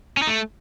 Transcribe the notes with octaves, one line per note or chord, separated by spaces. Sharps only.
C#4
D#4
A3